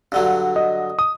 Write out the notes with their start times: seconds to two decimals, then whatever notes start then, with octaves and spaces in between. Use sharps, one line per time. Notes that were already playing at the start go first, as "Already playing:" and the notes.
0.12 G2 D3 F#3
0.56 D#5
0.99 D#6